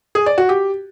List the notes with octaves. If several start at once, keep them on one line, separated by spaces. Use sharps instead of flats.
G#4
D5
F#4
G4